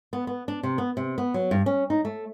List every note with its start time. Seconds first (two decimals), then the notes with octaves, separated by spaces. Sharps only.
0.13 B3
0.27 B3
0.48 D4
0.63 C3
0.78 B3
0.97 C3
1.18 B3
1.34 F#3
1.51 G2
1.66 C#4
1.90 D#4
2.05 A3